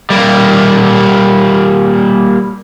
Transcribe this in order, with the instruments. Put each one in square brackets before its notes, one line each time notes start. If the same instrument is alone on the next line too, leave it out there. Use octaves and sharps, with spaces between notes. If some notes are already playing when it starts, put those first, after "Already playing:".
[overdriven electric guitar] G3 A#3